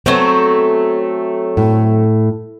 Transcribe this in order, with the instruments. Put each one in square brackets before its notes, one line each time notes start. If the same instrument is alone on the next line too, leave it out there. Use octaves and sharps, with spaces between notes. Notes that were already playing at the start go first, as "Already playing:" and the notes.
[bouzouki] F#3 A3 C4 [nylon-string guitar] B3
[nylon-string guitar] A2